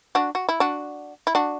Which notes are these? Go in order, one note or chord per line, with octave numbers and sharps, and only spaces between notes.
D4 F#4
F#4
E4
D4 F#4
E4
D4 F#4